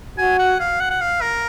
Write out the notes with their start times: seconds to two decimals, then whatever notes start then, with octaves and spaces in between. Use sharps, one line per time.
0.18 F#4 G#5
0.39 F#5
0.60 F5
0.80 F#5
0.91 F#5
1.01 F5
1.21 A#4